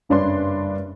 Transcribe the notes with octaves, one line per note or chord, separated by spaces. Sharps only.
F#1 G2 C#4 D4 B4 C6